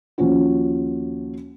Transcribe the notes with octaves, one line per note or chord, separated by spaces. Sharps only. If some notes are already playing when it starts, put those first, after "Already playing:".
D#2 F3 C#4 F4 F#4